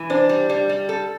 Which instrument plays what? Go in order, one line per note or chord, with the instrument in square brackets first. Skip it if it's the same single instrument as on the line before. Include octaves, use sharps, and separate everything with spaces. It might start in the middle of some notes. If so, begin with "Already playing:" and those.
Already playing: [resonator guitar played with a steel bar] E3
[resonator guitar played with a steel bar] D4 [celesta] C5
[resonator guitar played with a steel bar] G3
[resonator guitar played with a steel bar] G3 [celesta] D5
[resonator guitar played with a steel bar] G3
A4